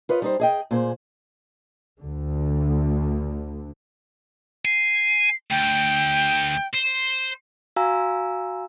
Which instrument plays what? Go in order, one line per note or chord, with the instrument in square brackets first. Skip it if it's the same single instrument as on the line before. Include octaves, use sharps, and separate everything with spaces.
[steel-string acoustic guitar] F4 B4 C#5 D#5
G3 D#4 C5
G#4 D#5 G5
A#2 G#4 C5
[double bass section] D2 D3
[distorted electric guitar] G#5 [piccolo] C7
[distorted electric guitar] D2 [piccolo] G5
[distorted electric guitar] C5
[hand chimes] F#4 F5 G#5 A#5 E6